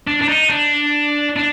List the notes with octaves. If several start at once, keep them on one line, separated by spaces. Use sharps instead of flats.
D4
D4
D#4
D4
D4